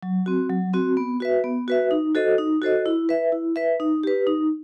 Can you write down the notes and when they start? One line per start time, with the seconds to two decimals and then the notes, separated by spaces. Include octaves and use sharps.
0.03 F#3
0.26 C4 F#4
0.50 F#3
0.73 C4 F#4
0.97 B3
1.20 F#4 B4 E5
1.44 B3
1.68 F#4 B4 E5
1.91 D#4
2.15 F#4 A4 C5 D#5
2.38 D#4
2.62 F#4 A4 C5 D#5
2.86 E4
3.09 B4 E5
3.32 E4
3.56 B4 E5
3.80 D#4
4.03 G4 B4
4.27 D#4